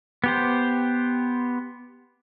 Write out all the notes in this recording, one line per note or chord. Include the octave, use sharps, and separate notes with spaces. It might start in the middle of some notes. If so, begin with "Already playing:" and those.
B3 G4 C5